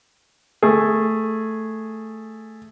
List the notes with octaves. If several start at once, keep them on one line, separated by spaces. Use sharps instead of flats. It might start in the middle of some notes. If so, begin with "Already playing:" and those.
A3 G#4